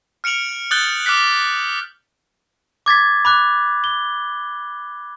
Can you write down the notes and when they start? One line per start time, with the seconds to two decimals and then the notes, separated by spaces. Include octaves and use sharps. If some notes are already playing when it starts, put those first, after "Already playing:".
0.24 F6 C#7 D7 F7 F#7
0.71 D#6 F#6 G6 A6 F#7 G7
1.05 D6 F6 F#6 B6 F#7
2.86 D6 G#6 A6 B6
3.25 B5 D6 F#6
3.84 G7